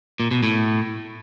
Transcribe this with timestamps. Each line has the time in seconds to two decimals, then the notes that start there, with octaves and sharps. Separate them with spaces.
0.20 A#2
0.31 B2
0.43 A2